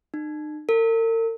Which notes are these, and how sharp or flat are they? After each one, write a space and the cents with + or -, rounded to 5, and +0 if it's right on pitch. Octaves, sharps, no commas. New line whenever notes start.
D#4 -40
A#4 -45